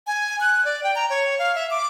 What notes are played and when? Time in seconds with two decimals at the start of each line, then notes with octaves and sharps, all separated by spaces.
0.07 G#5
0.41 F#6
0.65 D5
0.84 G5
0.95 A#5
1.10 C#5
1.39 F5
1.55 E5
1.71 D6